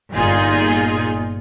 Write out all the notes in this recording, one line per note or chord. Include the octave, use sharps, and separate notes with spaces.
G1 A#2 D#4 F4 G#4